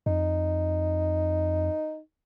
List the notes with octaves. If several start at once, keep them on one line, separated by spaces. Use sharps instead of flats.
F2 D#4